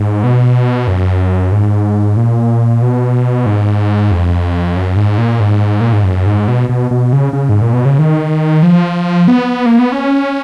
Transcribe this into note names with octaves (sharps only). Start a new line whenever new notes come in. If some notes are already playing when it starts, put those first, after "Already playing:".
Already playing: G#2
B2
F#2
G#2
A#2
B2
G#2
F2
F#2
G#2
A#2
G#2
A#2
G#2
F#2
G#2
B2
B2
B2
C#3
C#3
G#2
A#2
B2
C#3
D#3
F3
B3
A#3
B3
C#4